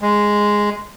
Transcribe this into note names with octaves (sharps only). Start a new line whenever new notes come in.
G#3